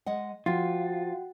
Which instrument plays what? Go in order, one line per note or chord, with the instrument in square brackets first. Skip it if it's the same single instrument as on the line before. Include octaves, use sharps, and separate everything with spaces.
[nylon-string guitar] G#3 D#5 F#5
[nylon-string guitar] F3 [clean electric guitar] F4 [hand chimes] F#4 F#5 G5